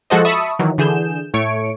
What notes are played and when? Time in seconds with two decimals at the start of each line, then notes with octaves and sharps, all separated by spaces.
0.10 F3 G#3 F#4 A4 C5 D#5
0.25 E5 A5 B5 C#6 D#6 E6
0.59 D#3 E3 F#3
0.78 D3 E3 G#4 G6 E7
1.34 A2 A3 C#5 C#6 C#7 D7